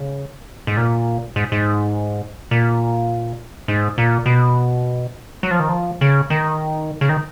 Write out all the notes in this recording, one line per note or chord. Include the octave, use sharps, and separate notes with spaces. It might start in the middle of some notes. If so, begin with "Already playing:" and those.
Already playing: C#3
G#2
A#2
G#2
G#2
A#2
G#2
A#2
B2
F#3
F3
D#3
F3
C#3
D#3
C#3
D#3